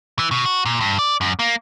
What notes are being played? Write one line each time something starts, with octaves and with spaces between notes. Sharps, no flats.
E3
B2
F#4
A#2
G2
D5
F#2
A#3